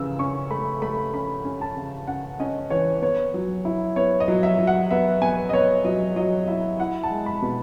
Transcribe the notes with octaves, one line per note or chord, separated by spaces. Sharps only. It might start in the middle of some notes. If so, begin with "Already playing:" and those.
Already playing: C#3 E3 E6
C#4 C#6
A3 B5
A3 B5
C#4 B5
C#4
A5
C#3
C#4 F#5
C#4 D#5
E3 C#5
B3 C#5
F#3
E4
B3 C#5
D#5
F#3
E5
F#3
F#5
B3 E5
B3 G#5
D#5
B3 C#5
F#3 D#5
F#3 D#5
E4 E5
E4 F#5
A5
G#3
B5
B2